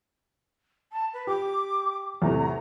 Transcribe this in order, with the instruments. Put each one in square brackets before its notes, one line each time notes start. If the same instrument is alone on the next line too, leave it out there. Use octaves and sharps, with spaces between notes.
[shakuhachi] A5
B4
[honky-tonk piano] G4 [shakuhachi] D6
[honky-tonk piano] E2 A2 C3 [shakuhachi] A#5